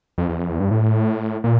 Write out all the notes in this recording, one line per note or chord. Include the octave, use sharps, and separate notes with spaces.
F2
E2
F2
E2
G2
A2
A#2